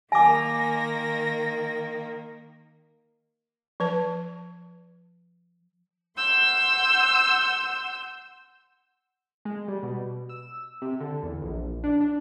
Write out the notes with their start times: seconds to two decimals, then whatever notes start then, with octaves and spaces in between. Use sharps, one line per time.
0.12 D#3 A#3 G#5 D6 A#6
3.80 F3 B4 A5
6.17 F#5 C6 E6 G6
9.45 G#3
9.68 G3
9.83 B2
10.29 E6
10.82 C3
11.00 D3
11.23 E2
11.42 A#1
11.84 D4
12.01 D4